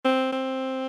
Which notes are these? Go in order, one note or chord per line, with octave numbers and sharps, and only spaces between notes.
C4
C4